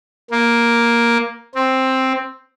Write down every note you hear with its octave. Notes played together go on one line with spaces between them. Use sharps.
A#3
C4